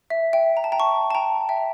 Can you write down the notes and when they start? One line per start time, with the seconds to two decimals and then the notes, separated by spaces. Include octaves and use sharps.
0.10 E5
0.33 E5 G5
0.57 A#5
0.64 A5
0.72 G5 A#5
0.80 A5 C#6
1.11 A5
1.15 G5 A#5
1.49 E5 G5